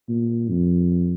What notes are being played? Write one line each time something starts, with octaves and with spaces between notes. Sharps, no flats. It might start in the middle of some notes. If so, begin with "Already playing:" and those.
A#2
F2